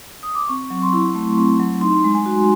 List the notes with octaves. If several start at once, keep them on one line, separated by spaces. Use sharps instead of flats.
D#6
D6
C4 C#6
F#3
C6
E4
A3
C4
F#3
D#4 C6
G#3
G#5
F#4